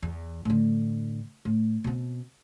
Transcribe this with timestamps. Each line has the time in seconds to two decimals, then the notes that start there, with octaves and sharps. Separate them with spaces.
0.02 E2
0.45 A2 D3
1.45 A2
1.84 B2 C4